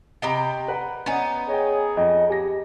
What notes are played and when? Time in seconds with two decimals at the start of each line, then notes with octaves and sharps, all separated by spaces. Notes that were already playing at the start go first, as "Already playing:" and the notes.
0.22 C3 G4 D#5 G5 A#5 B5
0.68 B4 F#5 A#5
1.06 B3 C#4 D#4 D5 G#5
1.49 G#4 C#5 D#5 G5
1.97 F2 D#5
2.30 G4 G#5 A#6